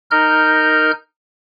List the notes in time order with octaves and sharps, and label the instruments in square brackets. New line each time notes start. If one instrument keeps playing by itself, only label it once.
[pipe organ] D#4 A#4 F6 G6